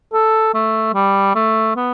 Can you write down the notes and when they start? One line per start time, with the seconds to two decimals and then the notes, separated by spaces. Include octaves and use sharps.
0.13 A4
0.54 A3
0.94 G3
1.35 A3
1.76 B3